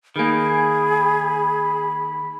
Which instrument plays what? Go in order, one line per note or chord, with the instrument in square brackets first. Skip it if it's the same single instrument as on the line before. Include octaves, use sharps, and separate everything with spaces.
[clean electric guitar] D#3 A#3 [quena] G#4 [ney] B5